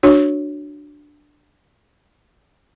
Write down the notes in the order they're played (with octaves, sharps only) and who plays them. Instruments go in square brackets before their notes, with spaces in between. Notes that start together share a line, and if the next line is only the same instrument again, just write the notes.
[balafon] D4 F#4 C#5